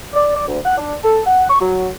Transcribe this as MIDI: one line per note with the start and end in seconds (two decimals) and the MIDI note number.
0.13 0.32 74
0.35 0.43 74
0.47 0.58 38
0.64 0.75 78
0.77 0.93 62
1.02 1.20 69
1.26 1.45 78
1.49 1.57 85
1.61 1.86 54